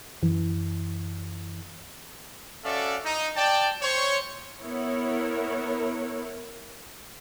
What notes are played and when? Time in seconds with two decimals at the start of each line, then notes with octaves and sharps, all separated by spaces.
0.23 F#2 E3
2.65 C#4 F#4 A4 D5 E5 F5
3.04 D#4
3.36 D5 G5 A5
3.82 C5 C#5
4.61 B3 E4 A#4 C#5